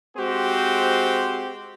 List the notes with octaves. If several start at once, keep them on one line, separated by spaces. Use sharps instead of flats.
G#3 C4 F#4 G4 C5